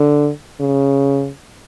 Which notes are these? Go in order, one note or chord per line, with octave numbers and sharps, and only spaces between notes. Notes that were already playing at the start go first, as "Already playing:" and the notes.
Already playing: D3
C#3